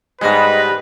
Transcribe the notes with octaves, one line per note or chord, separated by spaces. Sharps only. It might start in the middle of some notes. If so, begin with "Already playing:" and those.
G#2 G3 G#3 B3 B4 D#5